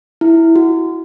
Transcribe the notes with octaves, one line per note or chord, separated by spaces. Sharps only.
E4
F#4